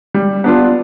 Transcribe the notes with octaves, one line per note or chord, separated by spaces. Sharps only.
G3
B3 D4 F4